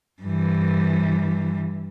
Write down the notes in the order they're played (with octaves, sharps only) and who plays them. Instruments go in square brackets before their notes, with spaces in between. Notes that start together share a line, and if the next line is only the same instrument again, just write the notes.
[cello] G2 E3